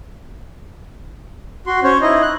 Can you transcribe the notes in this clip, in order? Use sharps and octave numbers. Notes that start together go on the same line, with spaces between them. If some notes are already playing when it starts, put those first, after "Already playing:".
F#4 C6
C#4 C5 C#5
D#4 E4 D#5
F#6